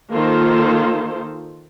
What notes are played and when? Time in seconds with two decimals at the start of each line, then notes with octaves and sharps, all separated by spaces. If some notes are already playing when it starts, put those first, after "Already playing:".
0.12 D#3 A#3 F4 A4 C5